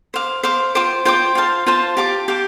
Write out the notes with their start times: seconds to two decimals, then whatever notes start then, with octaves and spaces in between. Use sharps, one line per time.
0.14 C5 F5 D6
0.43 C5 F5 D6
0.75 F4 C5 G5 D6
1.05 F4 C5 G5 D6
1.35 F4 C5 F5 A5
1.66 F4 C5 F5 A5
1.97 G4 F5 A5 D6
2.28 G4 F5 A5 D6